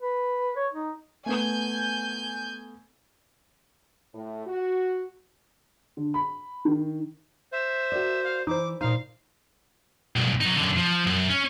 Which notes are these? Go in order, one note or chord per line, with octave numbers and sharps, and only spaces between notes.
B4
C#5
D#4
A3 B3 G#5 G6
A2
F#4
D3
B5
D#3
C5 E5
F#4 A#4 D5
F5
E3 D#4 C5 D6
A#2 D#4 C5 F5
B1 G2
F#3 D#4
F#2 D3
F3
F#2
C#4